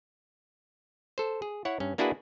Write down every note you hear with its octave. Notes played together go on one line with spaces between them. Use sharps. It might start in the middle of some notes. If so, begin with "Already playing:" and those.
A4 C5
G#4
E4 C#5 F#5
G2 C#4
A#3 D4 E4 F#4 G#4 B4